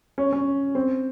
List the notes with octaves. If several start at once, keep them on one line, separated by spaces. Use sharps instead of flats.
C#4
C#4
C4